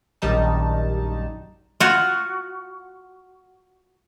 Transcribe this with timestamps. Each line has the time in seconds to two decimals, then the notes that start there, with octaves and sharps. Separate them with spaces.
0.22 A#1 F#2 D#3 G3 D#4 A5
1.80 F4 F#4